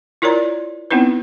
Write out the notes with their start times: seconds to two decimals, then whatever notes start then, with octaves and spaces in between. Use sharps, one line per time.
0.22 E4 F4 A#4 C#5 D5 A#5
0.91 B3 C4 D#4 E4 B4